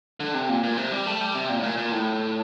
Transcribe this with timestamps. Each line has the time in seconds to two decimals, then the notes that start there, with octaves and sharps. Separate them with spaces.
0.20 D3
0.34 C3
0.49 A#2
0.63 A#2
0.77 C3
0.91 G3
1.06 A3
1.21 G3
1.35 C3
1.49 A#2
1.59 A2
1.63 A#2
1.78 A#2
1.92 A2